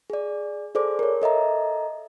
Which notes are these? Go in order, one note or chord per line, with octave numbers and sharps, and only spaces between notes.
G#4 D5
G#4 A4 C5 D5 D6
A#4 C#5
A4 D#5 E5 A#5